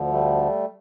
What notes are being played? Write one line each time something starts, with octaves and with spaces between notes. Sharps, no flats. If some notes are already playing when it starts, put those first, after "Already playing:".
Already playing: D2 D3 F3
G3 A3